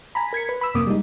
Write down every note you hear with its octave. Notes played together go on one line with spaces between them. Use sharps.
G#5 A#5 B5
A#4 G#6 B6 C#7
B4
B5 E6
F#2 C3 A#3 D6 D#6
G3 G#3 D#4